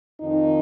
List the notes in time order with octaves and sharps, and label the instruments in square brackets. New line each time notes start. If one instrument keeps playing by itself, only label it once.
[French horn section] F2 D#3 D#4